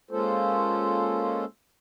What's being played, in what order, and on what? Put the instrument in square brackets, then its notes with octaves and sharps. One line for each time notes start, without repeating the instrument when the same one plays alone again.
[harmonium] G#3 A#3 C#4 F4 A4 C5